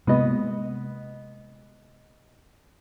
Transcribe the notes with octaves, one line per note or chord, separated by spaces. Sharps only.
C3 G#3 A#3 B3 D#5